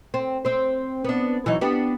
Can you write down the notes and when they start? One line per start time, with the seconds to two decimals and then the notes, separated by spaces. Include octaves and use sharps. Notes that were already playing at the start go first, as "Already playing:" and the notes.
0.14 C4
0.45 C4 C5
1.04 B3 D4
1.46 E3 F#3 D#4
1.61 B3 D4 G4